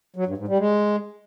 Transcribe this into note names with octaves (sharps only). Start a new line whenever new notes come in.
F#3
G2
G#2
G3
G#3